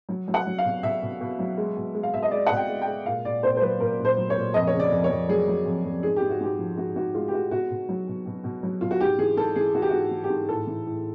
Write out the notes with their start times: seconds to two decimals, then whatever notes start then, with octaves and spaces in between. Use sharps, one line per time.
0.09 F#3
0.28 F#3
0.34 F#5
0.46 F#3
0.58 F5
0.65 B2
0.83 B2 E5
1.02 B2
1.21 B2
1.39 F#3
1.58 G#3
1.77 B2
1.94 G#3
2.03 F5
2.14 B2 E5
2.22 D#5
2.31 G#3 D5
2.47 B2 F#5
2.56 G5
2.69 G#3
2.82 G5
2.88 G#3
3.06 A#2 F5
3.25 A#2 D5
3.43 A#2 C5
3.57 C5
3.61 F#3 B4
3.80 A#2 A#4
3.99 A#2
4.05 C5
4.17 F#3
4.30 C#5
4.37 A#2
4.54 F2 D#5
4.67 C#5
4.74 C#3
4.80 D5
4.92 F2
5.04 C#5
5.10 F2
5.29 F#3 G#4
5.48 F#3
5.66 F2
5.85 F2
6.03 G#2 G#4
6.16 G4
6.22 G#2
6.30 F#4
6.40 G#2 G4
6.59 F3
6.77 G#2 F#4
6.96 G#2 F#4
7.14 G#3 F4
7.28 G4
7.33 G#3 F#4
7.51 B2 F#4
7.70 B2
7.89 F#3
8.08 B2
8.26 B2
8.44 B2
8.63 F#3
8.81 B2 F4
8.91 F#4
9.01 G#2 G4
9.18 E3 G#4
9.37 G#2 A4
9.56 E3 G#4
9.75 E3 F#4
9.82 G4
9.89 F#4
9.93 G#2
10.11 E3
10.24 G4
10.30 G#2
10.49 A2 A4
10.67 E3
10.86 A2